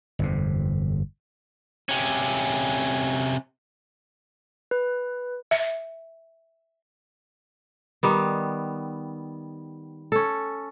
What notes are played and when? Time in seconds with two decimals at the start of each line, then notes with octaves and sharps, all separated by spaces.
0.19 G1 F2 C3
1.89 C3 C#4
4.71 B4
5.51 E5
8.03 D#3 G3 B3
10.12 C#4 A4